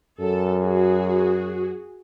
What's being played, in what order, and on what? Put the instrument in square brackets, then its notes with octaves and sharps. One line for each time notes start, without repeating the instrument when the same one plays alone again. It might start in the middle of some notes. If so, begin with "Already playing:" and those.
[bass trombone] F#2 [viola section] A4
[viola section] F#4 G#4